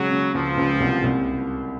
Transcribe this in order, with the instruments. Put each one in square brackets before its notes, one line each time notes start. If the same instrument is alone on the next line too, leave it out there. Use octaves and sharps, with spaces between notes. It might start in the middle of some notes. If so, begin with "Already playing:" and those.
Already playing: [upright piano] C#3 G#3 [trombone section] F#3
[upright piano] C#3
[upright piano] C#2 [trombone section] F3
[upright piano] C#2
C2
C2